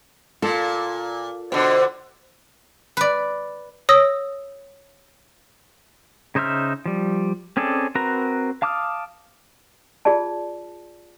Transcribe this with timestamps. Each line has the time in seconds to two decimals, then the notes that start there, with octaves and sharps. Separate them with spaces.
0.42 A#2 F4 A4
1.52 B2 D3 C5
2.97 B4 D5
3.89 C#5 D#6 E6 A#6
6.35 C#3 D#4 C5 E5 F6
6.86 F3 G3
7.57 C4 C#4 G#4 A4 D5
7.95 C4 F#4 A#4 B4 A#5
8.62 F5 A5 D6 D#6 F6
10.05 F4 G#4 D5 A5